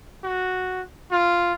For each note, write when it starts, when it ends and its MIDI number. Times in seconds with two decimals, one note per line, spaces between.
0.24 0.81 66
1.11 1.53 65